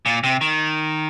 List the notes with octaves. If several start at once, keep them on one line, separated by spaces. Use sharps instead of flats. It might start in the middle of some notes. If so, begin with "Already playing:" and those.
A#2
C3
D#3